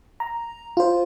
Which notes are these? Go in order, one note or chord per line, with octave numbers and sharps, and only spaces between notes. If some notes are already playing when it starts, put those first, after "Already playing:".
A#5
F4 C5